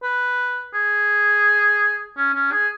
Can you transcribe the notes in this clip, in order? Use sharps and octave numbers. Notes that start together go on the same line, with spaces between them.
B4
G#4
C#4
C#4
G#4